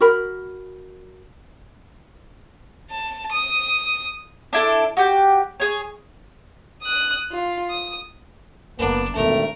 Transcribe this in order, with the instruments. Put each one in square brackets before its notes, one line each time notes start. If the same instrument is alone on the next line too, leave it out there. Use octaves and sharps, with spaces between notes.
[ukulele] F#4 A#4 B5
[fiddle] A5
D#6
[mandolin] D4 E4 A4
F#4 G4
G#4 C#5
[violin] D#6 F#6
F4
D#6
[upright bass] F#1 G2 [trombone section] A#3 B3 [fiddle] D4
[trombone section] G#1 G2 [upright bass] E2 B2 [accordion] A3 [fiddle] A#4